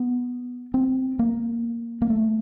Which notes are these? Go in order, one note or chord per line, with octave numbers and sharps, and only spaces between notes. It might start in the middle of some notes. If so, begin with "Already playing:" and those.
Already playing: B3
C4
A#3
A#3
A3